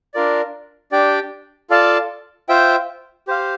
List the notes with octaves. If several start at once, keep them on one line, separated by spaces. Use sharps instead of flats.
D4 F4 A#4 D5
D4 G4 D5 G5
F4 A4 D5 F5 A5
F4 C5 E5 G5
G4 C5 F5